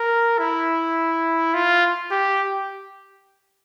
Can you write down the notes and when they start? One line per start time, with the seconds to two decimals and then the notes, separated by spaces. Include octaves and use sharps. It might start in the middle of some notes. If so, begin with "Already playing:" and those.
Already playing: A#4
0.39 E4
1.54 F4
2.11 G4